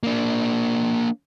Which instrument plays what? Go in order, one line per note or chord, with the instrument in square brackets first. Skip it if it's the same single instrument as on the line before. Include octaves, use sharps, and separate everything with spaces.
[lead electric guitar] A#3 D4